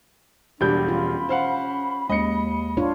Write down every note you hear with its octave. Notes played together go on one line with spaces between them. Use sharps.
E1 G3 D4 G4 B5 G6
C#4 F4
C5 F5 F#5
D#2 G#3 D#5 C#7
D4 F4 C#5